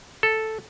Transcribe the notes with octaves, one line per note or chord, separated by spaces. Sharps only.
A4